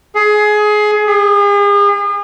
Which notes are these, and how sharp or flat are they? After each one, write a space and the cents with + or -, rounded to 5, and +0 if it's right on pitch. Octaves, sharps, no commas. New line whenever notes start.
G#4 +20
G#4 -40